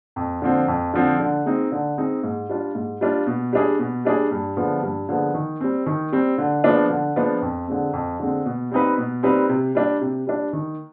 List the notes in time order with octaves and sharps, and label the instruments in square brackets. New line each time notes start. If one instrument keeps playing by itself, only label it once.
[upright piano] F2
D3 F3 C4
F2
D3 F3 C4
D3
G#3 C4 D#4
D3
G#3 C4 D#4
G#2
G3 D4 F4
G#2
G3 D4 F4
B2
G3 D4 G#4
B2
G3 D4 G#4
G2
D3 F3 G#3 B3
G2
D3 F3 G#3 B3
D#3
G3 C4
D#3
G3 C4
D3
F3 G#3 B3 D4
D3
F3 G#3 B3 D4
F2
D3 G#3 C4
F2
D3 G#3 C4
B2
G3 C4 D#4 B4
B2
G3 C4 D#4 B4
C3
G3 D4
C3
G3 D4
D#3